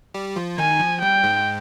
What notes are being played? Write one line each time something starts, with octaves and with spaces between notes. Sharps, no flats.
G3 G4
F3 F4
D#3 D#4 G#5
F3
G3 G5
G#2 G#3